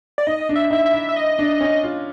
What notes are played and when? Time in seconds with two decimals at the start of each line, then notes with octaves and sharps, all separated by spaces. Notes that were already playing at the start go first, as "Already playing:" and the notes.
0.18 D5
0.27 D#4 D#5
0.49 D4
0.56 E5
0.71 D#4 E5
0.86 E5
0.93 E4
1.09 E5
1.16 D#5
1.39 D4
1.61 C#4
1.84 F4